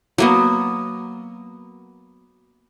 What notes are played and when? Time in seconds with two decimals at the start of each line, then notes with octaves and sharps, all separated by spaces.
0.18 F#3 A#3 B3